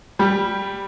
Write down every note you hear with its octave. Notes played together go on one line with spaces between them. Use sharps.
G3 G4